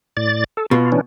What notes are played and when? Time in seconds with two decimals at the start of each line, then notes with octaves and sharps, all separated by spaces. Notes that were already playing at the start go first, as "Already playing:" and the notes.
0.17 A2 D5 A6
0.57 A4
0.71 B2 F4
0.92 E3 C#4 D4